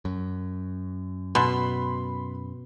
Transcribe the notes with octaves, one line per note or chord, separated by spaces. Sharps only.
F#2
B2 B5 C6